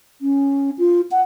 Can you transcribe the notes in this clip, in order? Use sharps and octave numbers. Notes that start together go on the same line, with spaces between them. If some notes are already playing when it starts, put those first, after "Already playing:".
C#4
F4
F#5